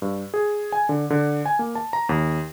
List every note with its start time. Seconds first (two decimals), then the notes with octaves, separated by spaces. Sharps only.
0.02 G2
0.34 G#4
0.72 G#5
0.89 D3
1.10 D3
1.46 G#5
1.59 A#3
1.75 A5
1.93 A#5
2.09 D#2